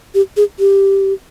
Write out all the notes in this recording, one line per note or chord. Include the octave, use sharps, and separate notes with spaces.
G4
G#4
G4